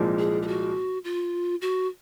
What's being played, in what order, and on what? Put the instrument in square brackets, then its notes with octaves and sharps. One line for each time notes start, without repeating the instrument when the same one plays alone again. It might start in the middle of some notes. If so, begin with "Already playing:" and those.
Already playing: [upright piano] C2 A#2 F3 G#3
[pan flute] G#4
G#4
F#4
F4
F#4